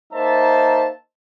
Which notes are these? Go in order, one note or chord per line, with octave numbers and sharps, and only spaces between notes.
A#3 D#4 C5 E5 A5